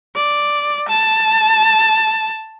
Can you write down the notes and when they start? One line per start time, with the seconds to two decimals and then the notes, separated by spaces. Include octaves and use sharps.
0.15 D5
0.88 A5